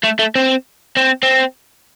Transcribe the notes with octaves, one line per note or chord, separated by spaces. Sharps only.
A3
A3
C4
C4
C4